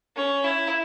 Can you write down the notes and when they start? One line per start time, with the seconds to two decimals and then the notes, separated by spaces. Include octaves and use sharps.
0.16 C#4
0.44 E4